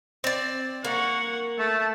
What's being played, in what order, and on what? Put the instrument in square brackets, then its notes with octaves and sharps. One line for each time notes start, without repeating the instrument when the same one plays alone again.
[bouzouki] C4 D5
[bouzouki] A#3 [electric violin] F#5 C#6
[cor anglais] A3 [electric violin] A5